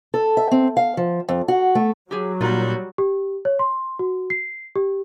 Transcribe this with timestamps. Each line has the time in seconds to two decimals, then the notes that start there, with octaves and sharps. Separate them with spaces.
0.14 A4
0.37 E5
0.51 C4
0.77 F5
0.97 F3
1.29 F2
1.48 F#4
1.75 A3
2.11 F#3 G4 G#4
2.41 A#2 G3 D#4 F4 F#4
2.98 G4
3.45 C#5
3.59 C6
3.99 F#4
4.30 C7
4.76 G4